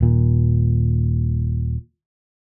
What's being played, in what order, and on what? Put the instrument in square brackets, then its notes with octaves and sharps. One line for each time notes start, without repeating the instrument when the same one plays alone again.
[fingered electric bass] D#1 A#2